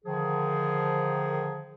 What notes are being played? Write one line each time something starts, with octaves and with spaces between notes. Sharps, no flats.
D3 D#3 F3 G#4